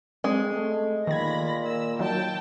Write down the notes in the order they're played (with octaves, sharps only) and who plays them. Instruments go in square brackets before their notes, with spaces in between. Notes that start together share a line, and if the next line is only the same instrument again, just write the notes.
[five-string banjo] G#3 [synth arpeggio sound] C4
[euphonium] A3
[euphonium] A#2 [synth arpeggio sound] D#3 G#6 [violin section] B5 A#6
[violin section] E6
[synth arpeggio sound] D#3 F#3 [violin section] G5 A5